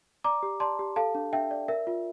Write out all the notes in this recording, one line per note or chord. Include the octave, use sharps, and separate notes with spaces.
D5 A#5 D6
G4
D5 A5 C6
G4
A4 F5 A5
D4
D4 E5 G5
D5
A#4 E5
F4